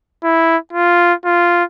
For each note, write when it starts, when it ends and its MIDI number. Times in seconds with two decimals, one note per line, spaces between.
0.24 0.57 64
0.73 1.14 65
1.24 1.64 65